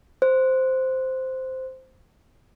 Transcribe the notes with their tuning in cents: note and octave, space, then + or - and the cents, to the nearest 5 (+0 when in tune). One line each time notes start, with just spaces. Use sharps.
C5 -5